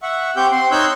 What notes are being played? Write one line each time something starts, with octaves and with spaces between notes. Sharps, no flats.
E5 F#5 C#6
C4 G4 C#6 G6
C4 C6
D#4 C#5 E6 F#6 G6